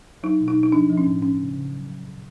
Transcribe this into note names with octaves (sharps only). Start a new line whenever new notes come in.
F#3 D#4
B2
D#4
B2
D#4
F3 D4
F3
C#4
A2
F3 C#4
C#3
C#3
F#3
F#3
A#2